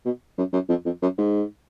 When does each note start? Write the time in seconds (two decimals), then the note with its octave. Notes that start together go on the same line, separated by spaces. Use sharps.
0.05 B2
0.38 F#2
0.53 F#2
0.69 F2
0.86 F2
1.02 F#2
1.18 G#2